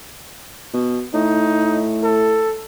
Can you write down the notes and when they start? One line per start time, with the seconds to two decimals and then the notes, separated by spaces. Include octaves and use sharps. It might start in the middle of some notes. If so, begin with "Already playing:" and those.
0.74 B2
1.14 A2 D#4
2.03 A4